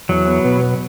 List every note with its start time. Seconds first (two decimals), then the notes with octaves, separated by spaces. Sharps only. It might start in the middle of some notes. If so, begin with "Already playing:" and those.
0.09 E2 F#3
0.27 B3
0.45 B2